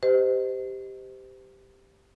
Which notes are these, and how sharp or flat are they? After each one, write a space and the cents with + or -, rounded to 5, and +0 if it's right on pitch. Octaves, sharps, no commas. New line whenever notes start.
G4 +0 C5 -30 D#5 +0